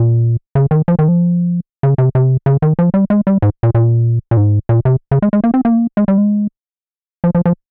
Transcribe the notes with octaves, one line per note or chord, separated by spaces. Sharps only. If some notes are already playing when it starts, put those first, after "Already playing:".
Already playing: A#2
C#3
D#3
F3
D#3
F3
C#3
C3
C3
C#3
D#3
F3
G3
G#3
G3
G#2
A#2
A#2
A#2
G#2
A#2
C3
C#3
G#3
G#3
A#3
C4
A#3
G#3
G3
G#3
F3
F3
F3